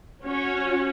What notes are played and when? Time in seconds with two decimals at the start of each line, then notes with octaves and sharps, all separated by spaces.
0.23 C#4 F#4 C#5